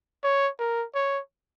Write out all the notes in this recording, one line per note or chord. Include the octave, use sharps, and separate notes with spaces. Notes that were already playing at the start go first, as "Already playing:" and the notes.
C#5
A#4
C#5